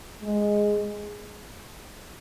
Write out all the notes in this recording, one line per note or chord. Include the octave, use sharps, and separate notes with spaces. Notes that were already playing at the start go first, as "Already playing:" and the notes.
G#3